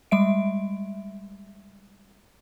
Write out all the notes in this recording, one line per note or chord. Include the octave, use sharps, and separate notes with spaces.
G3 G#3 E5 D7